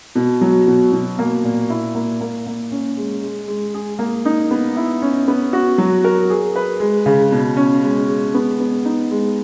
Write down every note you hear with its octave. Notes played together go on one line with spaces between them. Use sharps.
B2
F#3
B2
B2
A#3
A#2
E4
A#3
A#3
A#3
C#4
G#3
G#3
G#3
G#4
A#3
D#4
B3
E4
C#4
B3
F#4
F#3
A#4
G#4
B4
G#3
C#3
B2
C#4
G#3
G#3
B3
B3
D#4
G#3